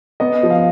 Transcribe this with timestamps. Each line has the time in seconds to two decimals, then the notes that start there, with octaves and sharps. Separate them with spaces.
0.20 B3 D#5
0.43 F3
0.50 F5